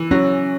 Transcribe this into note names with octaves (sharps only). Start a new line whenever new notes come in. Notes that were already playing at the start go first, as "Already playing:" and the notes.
Already playing: E3
F#3 C#4